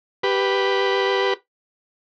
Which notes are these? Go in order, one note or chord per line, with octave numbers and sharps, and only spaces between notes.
G4 B4